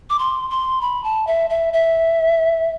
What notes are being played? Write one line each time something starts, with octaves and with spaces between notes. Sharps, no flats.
D6
C6
C6
B5
A5
E5
E5
E5